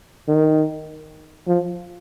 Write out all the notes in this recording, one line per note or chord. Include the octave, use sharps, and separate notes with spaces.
D#3
F3